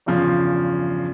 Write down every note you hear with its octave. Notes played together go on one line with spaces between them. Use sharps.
E2 G2 C#3 F3